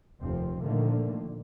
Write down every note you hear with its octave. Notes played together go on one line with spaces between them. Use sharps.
F1 D#2 F3 C4
A#2 D3 D#3 F3 A3 A#3